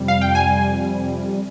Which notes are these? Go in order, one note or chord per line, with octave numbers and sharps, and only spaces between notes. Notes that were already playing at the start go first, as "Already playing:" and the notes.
Already playing: F2 C3 G3
F5
G5
G#5